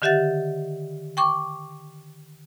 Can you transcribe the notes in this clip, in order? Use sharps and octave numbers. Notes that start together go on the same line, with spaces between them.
D3 D#3 G4 E5 F#5 A6
G5 C#6 D6